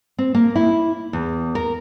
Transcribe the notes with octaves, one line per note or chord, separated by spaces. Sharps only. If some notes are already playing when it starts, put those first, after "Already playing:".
C4
A#3
E4
E2
A#4